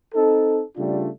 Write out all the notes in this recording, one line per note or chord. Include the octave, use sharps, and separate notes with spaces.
C4 D#4 A4
C#3 G3 A3 D4 F4